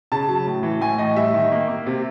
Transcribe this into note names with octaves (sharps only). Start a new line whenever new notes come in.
C#3 A5
F#3
A2
E3
A2 G#5
A2 D#5
G3 E5
D#3
A#3
A#3
C3